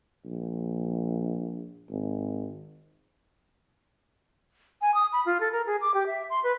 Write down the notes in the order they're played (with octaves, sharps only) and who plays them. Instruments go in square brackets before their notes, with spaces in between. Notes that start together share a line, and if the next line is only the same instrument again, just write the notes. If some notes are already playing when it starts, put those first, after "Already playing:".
[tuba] A#1
G#1
[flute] G#5
D#6
B5
F4
A4
A#4
G#4
D6
G4
E5
C6
B4